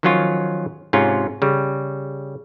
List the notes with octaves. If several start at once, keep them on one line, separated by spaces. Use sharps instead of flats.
D#3 F3 F#3 C#4 F4
G#2 C3 C#4 F4
C#3 G3